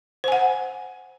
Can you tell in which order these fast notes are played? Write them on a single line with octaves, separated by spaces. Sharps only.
C5 G#5 F#5